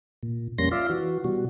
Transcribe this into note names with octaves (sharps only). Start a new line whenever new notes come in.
A#2
F2 G3 A#3 C#4 C6 A#6
F4 D5 E5 F5
E3 F#4
B2 G3 F#4